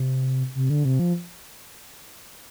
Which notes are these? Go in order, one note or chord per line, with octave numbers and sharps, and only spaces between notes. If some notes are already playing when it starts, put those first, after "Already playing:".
Already playing: C3
C3
D3
C3
F3